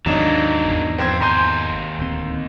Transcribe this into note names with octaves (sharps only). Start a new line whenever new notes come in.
D#2 G#2 D#3 E3 F#3 A#3 D4 D#4
G#1 E2 B2
F2 C4 C5 G#6
D#2 G#5 A#5 C6 G6
D1 D2 C4